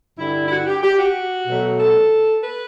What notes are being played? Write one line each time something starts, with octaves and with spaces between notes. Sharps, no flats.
G2 D3 G3 E4
E4
F#4
G4
G4
F#4
B2 F#3 A3
A4
B4